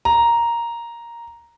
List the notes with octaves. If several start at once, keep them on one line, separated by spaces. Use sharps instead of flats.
A#5